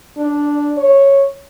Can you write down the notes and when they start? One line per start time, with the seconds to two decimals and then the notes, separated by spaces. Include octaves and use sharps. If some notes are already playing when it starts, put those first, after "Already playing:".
0.18 D4
0.77 C#5